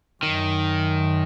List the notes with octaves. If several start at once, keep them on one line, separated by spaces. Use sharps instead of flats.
F#2 D#3